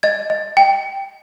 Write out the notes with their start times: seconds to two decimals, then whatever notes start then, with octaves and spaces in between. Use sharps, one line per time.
0.03 D#5 G#6
0.30 D#5
0.57 G5